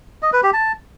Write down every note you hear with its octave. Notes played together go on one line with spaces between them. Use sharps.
D#5
B4
G4
A5